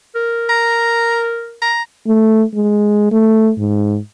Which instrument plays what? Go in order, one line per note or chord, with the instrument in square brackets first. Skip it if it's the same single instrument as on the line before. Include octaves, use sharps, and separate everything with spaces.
[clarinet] A#4
[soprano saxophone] A#5
A#5
[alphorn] A3
G#3
A3
G#2